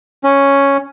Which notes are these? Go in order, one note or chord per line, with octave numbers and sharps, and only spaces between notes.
C#4